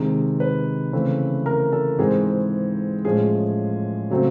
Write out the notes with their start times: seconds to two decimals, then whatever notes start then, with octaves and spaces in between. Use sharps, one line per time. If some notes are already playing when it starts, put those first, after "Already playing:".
Already playing: C3 D#3 G#3
0.40 B4
0.93 C#3 E3 A3 C4
1.46 A#4
1.72 A4
1.99 G#2 E3 G#3 C4 G#4
3.05 A2 F3 G#3 C#4 G#4
4.10 C#3 F#3 A3 C4